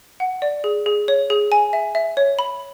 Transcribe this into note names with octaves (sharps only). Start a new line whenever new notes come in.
F#5
D5
G#4
G#4
C#5
G#4
G#5
E5
E5
C#5
B5